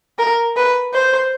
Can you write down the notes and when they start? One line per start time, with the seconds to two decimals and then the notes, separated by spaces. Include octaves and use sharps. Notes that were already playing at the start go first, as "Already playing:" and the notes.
0.19 A#4
0.57 B4
0.94 C5